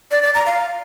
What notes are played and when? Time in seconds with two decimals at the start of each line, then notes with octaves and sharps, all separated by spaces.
0.11 D5
0.23 D5
0.34 A#5
0.46 F5